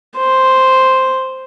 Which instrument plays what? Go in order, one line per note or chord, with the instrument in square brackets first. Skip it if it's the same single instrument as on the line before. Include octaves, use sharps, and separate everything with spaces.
[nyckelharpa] C5